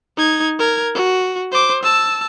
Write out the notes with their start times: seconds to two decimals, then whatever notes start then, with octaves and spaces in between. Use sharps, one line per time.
0.17 D#4 G#6
0.59 A#4 G#6
0.95 F#4
1.52 C5 D6
1.83 A5 E6